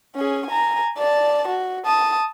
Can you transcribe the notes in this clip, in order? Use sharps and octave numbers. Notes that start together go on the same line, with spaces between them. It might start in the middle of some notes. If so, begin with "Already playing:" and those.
C#4 G#4
G#5 A#5
D5 A5
F#4
A5 D#6